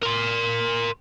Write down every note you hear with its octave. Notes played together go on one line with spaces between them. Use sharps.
A#4 C6